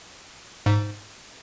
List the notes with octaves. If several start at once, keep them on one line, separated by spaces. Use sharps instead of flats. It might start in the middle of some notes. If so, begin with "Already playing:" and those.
G#2